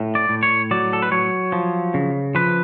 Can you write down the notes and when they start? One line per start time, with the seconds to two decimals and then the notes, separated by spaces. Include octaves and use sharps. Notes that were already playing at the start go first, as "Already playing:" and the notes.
Already playing: A2
0.15 D5
0.29 A2
0.43 C#5
0.71 F#3 D5
0.93 A4
1.02 B4
1.12 F#3 C#5
1.52 F3
1.94 C#3
2.35 F3 B4